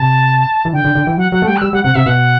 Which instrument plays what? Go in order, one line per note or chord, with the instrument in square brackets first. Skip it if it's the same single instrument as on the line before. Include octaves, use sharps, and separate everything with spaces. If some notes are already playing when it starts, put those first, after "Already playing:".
Already playing: [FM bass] C3 [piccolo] A5
[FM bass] E3
[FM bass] D3 [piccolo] G5
[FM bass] D3
D3
E3
[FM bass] F#3 [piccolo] F#5
[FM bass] F#3 [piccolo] F#5
[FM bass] A3
[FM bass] G3 [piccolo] G5
[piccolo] F#6
[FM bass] G3 [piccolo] E6
[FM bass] G3 [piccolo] F#5
[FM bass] C3 [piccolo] F#5
[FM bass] C3 [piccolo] E5
[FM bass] B2 [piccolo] F#5